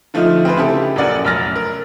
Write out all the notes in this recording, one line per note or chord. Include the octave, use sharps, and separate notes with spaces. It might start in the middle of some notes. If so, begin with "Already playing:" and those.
D3 F3 A3 D#4 F4
C4 G#4 B4 C5
C#3 E4 G4 A4
A#1 F#2 A#4 D5 F#5 G#5
F1 F#2 F6 A6 A#6
A#4